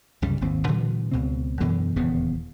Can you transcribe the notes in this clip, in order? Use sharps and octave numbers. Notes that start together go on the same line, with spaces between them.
C2 F#2 C#3 G3
G#1 D#2 C4
A#2 D3 E3 F#3
C#2 B2 C4
F#2 B2 D3 E3
D#1 E2 C#3 B3